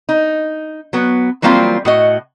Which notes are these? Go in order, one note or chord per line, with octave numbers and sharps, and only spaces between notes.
D#4
F#3 B3
E3 F#3 G3 A#3 C4 F4
A2 F#4 D#5